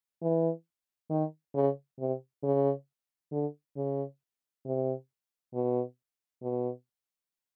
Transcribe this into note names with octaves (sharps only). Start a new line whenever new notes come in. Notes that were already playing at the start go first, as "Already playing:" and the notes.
E3
D#3
C#3
C3
C#3
D3
C#3
C3
B2
B2